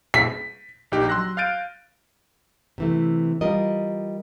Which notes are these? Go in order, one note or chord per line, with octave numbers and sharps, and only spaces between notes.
B6
A#1 D#4 G4 G5
F#3 C6 E6 F#6 A#6
F5 F6 G6 A6 D7 D#7
C3 E3 A3
G3 F4 A#4 D#5